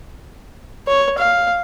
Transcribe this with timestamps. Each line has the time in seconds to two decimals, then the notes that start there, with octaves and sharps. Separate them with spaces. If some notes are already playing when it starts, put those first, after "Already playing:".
0.87 C#5
1.18 F5